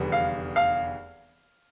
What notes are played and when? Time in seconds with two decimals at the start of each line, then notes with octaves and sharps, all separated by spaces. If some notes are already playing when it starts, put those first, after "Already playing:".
Already playing: F1 E2 D3 G3 B3
0.12 F5
0.56 F5